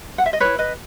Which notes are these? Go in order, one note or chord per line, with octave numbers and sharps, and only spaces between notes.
F#5
E5
D#5
E4 B4 C#5
B4 D#5